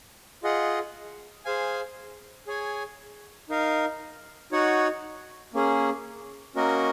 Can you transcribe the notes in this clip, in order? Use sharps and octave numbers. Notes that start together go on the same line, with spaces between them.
F4 G#4 D#5 F#5
G#4 C5 F5 G#5
G#4 C#5 G#5
D#4 A#4 F5
D#4 F#4 C#5 F#5
A#3 C#4 G#4
A#3 C#4 F#4 A#4 D#5